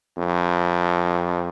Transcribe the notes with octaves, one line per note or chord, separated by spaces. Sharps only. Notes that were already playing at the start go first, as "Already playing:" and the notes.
F2